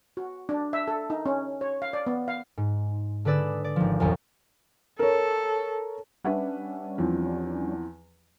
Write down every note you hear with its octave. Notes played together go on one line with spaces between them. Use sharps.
F#4
D4
E5
A4
D#4
C#4
C#5
F5
D5
B3
F5
G#2
D3 G#4 B4 D5 E6
D5
G#1 F3
E1 B1 F2 C#4
A4 A#4 C#5
G3 C#4 D4 B4 E5 F#5
E2 F3 C4